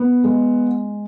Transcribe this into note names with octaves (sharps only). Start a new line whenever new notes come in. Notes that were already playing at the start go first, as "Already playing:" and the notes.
Already playing: B3
G#3